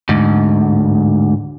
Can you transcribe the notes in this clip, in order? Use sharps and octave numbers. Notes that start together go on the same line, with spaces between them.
D2 G#2